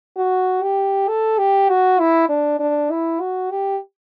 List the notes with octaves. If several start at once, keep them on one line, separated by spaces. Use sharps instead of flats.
F#4
G4
A4
G4
F#4
E4
D4
D4
E4
F#4
G4